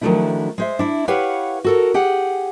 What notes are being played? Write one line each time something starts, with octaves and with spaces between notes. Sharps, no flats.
D#3 F3 F#3 A3 D4 E4
G#3 C5 E5
D4 E4
E4 G4 B4 C#5 F5 F#5
F#4 A4 A#4
G4 G#4 F#5